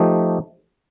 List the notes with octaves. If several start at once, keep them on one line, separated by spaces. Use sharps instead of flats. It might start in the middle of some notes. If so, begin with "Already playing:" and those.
Already playing: F3 A3 D#4 G4